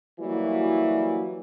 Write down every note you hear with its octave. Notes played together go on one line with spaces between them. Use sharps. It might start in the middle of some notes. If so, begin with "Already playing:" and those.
E3 F#3 G3 A#3 E4 F#4